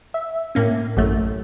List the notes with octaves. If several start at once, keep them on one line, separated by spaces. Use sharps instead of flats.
E5
A2 A#3 C#4
A1 F#2 A3